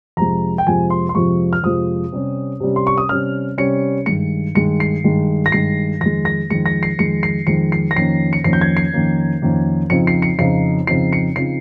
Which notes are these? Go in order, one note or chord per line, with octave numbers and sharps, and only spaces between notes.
F2 C3 F3 G#3 A#5
G5
F2 C3 F3 G#3 G#5
C6
C6
F2 C3 F3 G#3 C#6
F6
F2 C3 F3 G#3 D#6
C3 G3 C#4
C3 G3 C#4
C6
C#6
D#6
C3 G3 C#4 F6
C3 G3 C#4 C#7
G2 D#3 G#3 C#7
G2 D#3 G#3 C#7
C7
G2 D#3 G#3
A#6
G2 D#3 G#3 C7
F2 D#3 G#3 A#6
A#6
F2 D#3 G#3 C#7
A#6
C7
F2 D#3 G#3 C#7
C7
F2 D#3 G#3 C#7
C7
A#6
F2 D#3 A#3 C#4 C7
C#7
F2 D#3 A#3 C#4 C7
G6
G#6
C7
F2 D#3 A#3 C#4
F2 D#3 A#3 C#4
F2 C#3 F3 C4 D#4 C#7
C7
C#7
F2 C#3 F3 C4 D#4 C7
F2 C#3 F3 C4 D#4 C7
C#7
C#3 F3 C4 D#4 C7